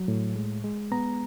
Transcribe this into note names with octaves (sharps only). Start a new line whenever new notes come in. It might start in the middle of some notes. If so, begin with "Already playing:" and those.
Already playing: F#3
A2
G#3
G#3
B3 A#5